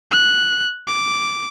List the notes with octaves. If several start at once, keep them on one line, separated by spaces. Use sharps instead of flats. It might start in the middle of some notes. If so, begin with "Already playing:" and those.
F#6
D6